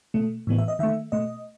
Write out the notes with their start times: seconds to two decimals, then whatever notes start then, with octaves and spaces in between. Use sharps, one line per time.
0.14 B2 A3
0.47 A2 E3 B3
0.58 E5
0.68 D#5
0.79 D#3 A3 E5
1.12 B2 A3 D#5